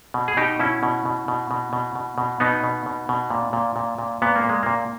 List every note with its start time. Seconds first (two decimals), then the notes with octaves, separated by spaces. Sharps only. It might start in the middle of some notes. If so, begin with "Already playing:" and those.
0.14 B2
0.28 G#4
0.37 B2 D#4 G4
0.59 B2 C#4 E4
0.83 B2
1.06 B2
1.28 B2
1.51 B2
1.73 B2
1.95 B2
2.18 B2
2.40 B2 B3 D#4
2.64 B2
2.86 B2
3.09 B2
3.30 A#2
3.53 A#2
3.76 A#2
3.98 A#2
4.22 A#2 B3
4.36 A#3
4.44 A#2
4.49 G#3
4.63 A#2 A#3